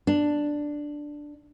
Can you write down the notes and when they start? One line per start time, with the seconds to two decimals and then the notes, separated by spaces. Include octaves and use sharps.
0.07 D4